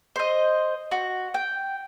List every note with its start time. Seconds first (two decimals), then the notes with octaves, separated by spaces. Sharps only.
0.16 C5 D#5
0.91 F#4
1.34 G5